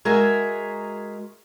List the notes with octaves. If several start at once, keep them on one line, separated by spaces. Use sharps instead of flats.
G#3 F#4 G#4 A#4 E5